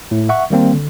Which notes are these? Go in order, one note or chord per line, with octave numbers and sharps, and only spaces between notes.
A2
E5 F#5 C#6
D#3 G3 A#3 C4
D3